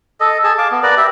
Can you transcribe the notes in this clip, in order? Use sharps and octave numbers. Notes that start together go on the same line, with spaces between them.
A4 D#5
G#4 A5
F5 A5 D6
B3
A#4 B4 D5
G4 E5